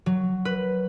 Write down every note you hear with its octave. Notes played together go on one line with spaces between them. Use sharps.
F#3
B4